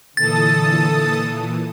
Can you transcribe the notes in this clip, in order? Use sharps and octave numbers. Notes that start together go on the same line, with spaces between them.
A#2 D3 E3 A4 A5 D#6 A6